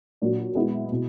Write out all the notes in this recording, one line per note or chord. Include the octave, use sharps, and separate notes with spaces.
A#2 F#3 A#3 D4
G#3 B3 E4
B2